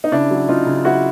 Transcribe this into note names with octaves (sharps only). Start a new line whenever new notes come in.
D#4
C#3 D4 E4
F#3
C#3 D#4 F4
C#3
F#3 E4 F#4